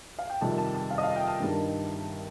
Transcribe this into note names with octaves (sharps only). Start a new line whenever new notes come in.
F5
G5
F2 C3 D#3 G3 A5
A5
A5
F5
D#5
F5
G5
A5
G2 D#3 G3